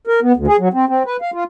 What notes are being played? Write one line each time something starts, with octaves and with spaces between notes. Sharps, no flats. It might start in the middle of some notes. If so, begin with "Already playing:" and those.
A#4
B3
D2
G#4
F#3
C4
C4
B4
F5
F4